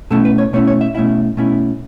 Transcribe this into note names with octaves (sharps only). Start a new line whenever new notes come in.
B2 A3 C#4 E4 A4
B4
C#5
B2 A3 C#4 E4 C#5
C#5
E5
B2 A3 C#4 E4 E5
B2 A3 C#4 E4